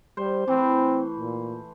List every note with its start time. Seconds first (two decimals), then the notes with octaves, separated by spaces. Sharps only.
0.17 G3 C5
0.48 E3 A3 C4
1.19 A#2